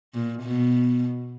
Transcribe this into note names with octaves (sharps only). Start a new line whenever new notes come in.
A#2
B2